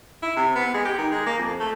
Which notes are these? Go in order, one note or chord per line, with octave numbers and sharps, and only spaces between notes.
E4
C3
B3
G#3
G4
D#3
G#3
A#3
F2
A3